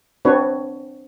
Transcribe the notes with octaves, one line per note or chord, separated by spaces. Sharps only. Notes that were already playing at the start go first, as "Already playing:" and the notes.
C4 D4 F#4 B4 C#5